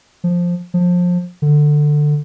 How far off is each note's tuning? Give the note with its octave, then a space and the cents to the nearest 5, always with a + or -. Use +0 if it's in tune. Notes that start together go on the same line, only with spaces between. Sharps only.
F3 +5
F3 +25
D3 +15